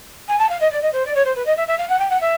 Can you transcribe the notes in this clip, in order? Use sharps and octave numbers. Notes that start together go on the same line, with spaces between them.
G#5
A5
F5
D#5
D5
D#5
C5
D5
C#5
C5
B4
D#5
E5
E5
F5
F#5
G5
F#5
E5